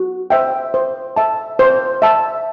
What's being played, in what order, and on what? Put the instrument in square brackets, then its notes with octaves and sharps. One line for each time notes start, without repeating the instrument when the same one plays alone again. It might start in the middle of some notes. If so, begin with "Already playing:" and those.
Already playing: [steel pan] F#4
C5 E5 G5
C5
E5 A5
C5
E5 A5